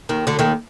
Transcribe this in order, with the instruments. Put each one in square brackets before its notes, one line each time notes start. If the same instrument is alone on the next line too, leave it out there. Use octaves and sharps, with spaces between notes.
[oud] D#2 D#3
D2 D3
D#2 D#3